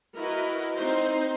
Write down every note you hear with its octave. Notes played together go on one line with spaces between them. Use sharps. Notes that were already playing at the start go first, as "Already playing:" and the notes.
E4 F#4 A#4 B4 D#5
C4 D#4 C5